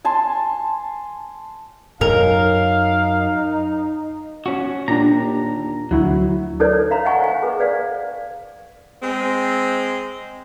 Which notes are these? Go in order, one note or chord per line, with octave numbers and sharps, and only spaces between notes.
G#5 A5 C6
F#2 D#4 A#4 F5
C#4 F#4
D#2 A#2 D4 G4 A#5
D2 F#3 E4 F#4
D#4 A4 B4 C#5 D5
C#5 E5 F5 A#5 B5
D#5 E5 F#5 G#5 A5 C#6
C5 F5 G#5
G#4 B4
B4 D5 F5
G#3 C4